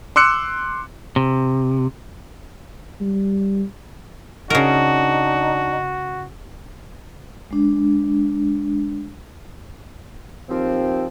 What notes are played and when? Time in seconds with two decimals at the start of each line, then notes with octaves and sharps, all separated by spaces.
0.16 C6 D6 E6 F#6 C#7
1.16 C3
3.01 G3
4.50 C#3 D4 D#4 F#4 A#4
7.51 G#3 D4
10.49 D#2 F3 C4